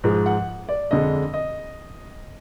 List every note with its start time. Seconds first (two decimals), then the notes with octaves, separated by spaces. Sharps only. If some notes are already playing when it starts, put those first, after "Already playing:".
0.04 G#2 F3 G#3
0.26 F#5
0.69 D5
0.91 F2 D3 G#3 D#5
1.34 D#5